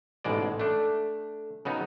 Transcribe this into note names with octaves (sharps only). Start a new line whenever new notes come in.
A1 G#2 B2 G#3 D5
A3 D4
C#3 F#3 B3 D#4